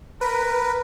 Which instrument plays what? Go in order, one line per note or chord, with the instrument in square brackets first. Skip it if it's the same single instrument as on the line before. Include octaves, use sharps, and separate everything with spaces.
[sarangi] A#4 [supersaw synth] B4